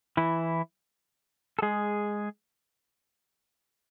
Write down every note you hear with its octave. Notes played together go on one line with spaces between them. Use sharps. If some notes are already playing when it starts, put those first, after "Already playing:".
E3 E4
A4
G#3 G#4